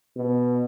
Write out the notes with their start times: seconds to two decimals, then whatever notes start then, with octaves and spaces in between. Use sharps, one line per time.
0.16 B2